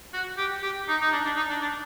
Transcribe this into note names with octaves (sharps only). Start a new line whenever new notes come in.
F#4
G4
G4
D#4
D#4
D4
D4
D#4
D4
D4